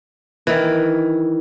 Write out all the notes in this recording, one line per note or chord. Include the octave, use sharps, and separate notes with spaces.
D#3 E3